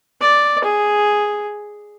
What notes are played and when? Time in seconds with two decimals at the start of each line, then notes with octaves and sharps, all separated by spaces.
0.21 D5
0.64 G#4